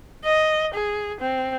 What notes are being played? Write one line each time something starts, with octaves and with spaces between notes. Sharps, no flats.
D#5
G#4
C4